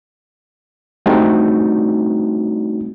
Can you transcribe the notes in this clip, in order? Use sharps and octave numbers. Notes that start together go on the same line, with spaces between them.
G3 A3 C4 D4 D#4 F#4